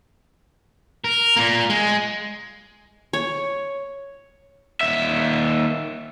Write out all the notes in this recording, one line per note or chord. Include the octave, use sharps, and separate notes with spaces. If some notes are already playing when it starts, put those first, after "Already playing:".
A#4
A#2 A#3
G#3
C#5
D#2 E5